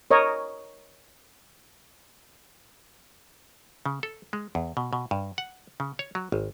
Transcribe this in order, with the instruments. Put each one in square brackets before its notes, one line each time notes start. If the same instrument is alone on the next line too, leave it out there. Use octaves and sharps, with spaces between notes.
[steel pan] A#4 C#5 D#5
[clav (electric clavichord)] C#3
A4
G#3
E2
B2
B2
G2
F#5
C#3
C#5
F#3
G#1